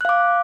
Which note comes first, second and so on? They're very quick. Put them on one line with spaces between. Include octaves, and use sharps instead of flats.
F#6 F5 D6